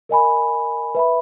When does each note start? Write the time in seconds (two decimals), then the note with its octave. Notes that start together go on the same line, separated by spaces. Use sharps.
0.09 A#4 D#5 G#5 B5
0.95 B4 E5 B5